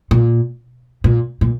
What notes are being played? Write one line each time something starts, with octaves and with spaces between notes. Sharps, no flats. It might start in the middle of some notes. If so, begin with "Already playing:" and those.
A#2
A#2
A#2